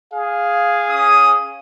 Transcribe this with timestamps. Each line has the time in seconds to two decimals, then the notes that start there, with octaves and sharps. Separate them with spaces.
0.13 G#4 F5
0.89 C#4 D#6